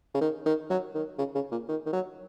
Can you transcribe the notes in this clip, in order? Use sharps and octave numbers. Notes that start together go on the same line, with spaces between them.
C#3
D#3
D#3
F#3
D#3
C#3
C#3
A#2
D#3
D#3
F#3